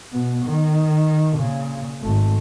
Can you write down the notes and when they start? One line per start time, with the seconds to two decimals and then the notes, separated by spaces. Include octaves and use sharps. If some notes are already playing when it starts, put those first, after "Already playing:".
0.11 B2 B3
0.44 D#3
1.37 A#2 C#3
2.01 G#1 A3